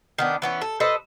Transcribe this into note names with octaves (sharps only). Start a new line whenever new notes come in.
D#3 B3 D4
E3 B3 C#4
A4
A4 B4 C5 D#5